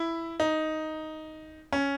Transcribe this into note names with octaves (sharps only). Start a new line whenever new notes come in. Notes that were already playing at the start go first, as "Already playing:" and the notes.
Already playing: E4
D#4
C#4